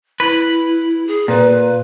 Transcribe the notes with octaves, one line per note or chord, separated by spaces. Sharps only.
E4 B4
G#4
A#2 B4